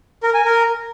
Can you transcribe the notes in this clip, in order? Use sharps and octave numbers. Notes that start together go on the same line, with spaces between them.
A#4
G#5
A#4